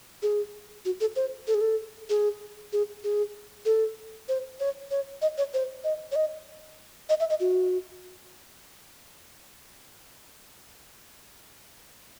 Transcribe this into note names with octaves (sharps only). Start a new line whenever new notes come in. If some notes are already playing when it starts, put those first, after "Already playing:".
G#4
F#4
A4
C5
A4
G#4
A4
G#4
G#4
G#4
A4
C5
C#5
C#5
D#5
C#5
C5
D#5
C#5
D#5
D#5
E5
D#5
F#4